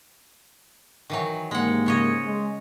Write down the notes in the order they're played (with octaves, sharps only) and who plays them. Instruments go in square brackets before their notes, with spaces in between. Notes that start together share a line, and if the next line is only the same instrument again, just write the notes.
[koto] D#3 E3 F#3
[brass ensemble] G#2 C3 A#3 [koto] G#3 F#5
[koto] C#3 C#5 D#5
[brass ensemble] G#3